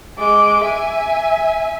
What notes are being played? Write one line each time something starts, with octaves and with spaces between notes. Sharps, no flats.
G#3 D6
E5 G#5